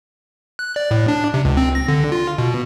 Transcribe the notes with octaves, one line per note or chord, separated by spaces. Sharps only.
F#6
D5
A2
D4
C3
C#2
C4
A#6
D3
F4
B2